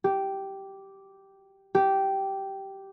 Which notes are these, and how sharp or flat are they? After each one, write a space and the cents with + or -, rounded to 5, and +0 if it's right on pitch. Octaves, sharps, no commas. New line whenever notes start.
G4 -10
G4 -10